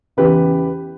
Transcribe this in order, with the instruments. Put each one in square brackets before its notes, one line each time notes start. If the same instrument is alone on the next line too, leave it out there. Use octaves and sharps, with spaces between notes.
[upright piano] E2 C#3 E3 G4 B4